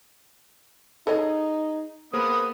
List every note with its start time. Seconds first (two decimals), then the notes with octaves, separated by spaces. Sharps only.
1.07 D#4 G#4 A4 C#5 D#5
2.13 A#3 B3 G#4 A#4 C5 D#6